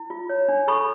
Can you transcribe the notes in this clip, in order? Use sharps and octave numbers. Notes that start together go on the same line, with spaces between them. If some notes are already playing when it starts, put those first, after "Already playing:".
Already playing: E4
F4
C#5
D4
A4 B5 C#6